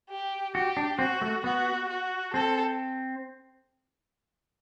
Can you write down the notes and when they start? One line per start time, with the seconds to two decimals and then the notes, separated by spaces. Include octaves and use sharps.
0.10 G4
0.55 F#4 G4
0.77 D4
0.99 C4 F#4
1.21 A3
1.44 B3 F#4
1.89 F#4
2.34 C4 A4